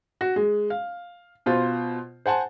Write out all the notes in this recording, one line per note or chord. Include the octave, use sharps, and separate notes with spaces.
F#4
G#3
F5
B2 F4 C5
C5 F#5 G#5 A5